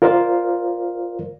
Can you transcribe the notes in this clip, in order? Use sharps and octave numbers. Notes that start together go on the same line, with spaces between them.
F4 A#4 C5 D5 F5